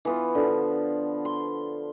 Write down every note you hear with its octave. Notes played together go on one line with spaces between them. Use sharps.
E3 B3 F4
D3 F3
C6